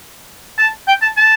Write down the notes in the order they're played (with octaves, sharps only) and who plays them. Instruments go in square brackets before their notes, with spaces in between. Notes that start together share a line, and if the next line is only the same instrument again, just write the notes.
[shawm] A5
G5
A5
A5